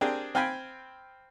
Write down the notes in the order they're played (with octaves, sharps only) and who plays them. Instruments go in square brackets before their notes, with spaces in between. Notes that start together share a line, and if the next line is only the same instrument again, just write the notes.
[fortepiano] C4 D4 G4 G#4 A#4
C4 F5 G5 G#5 B5